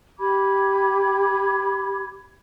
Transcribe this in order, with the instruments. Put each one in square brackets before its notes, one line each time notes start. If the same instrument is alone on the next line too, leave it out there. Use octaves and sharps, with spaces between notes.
[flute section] G4 B5 D6 G#6